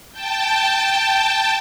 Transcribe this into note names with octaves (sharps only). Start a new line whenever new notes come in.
G5 A5